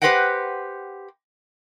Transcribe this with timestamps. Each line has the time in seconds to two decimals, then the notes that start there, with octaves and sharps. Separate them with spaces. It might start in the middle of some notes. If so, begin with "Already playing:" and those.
0.02 G4 B4 C5 D#5 F#5 G5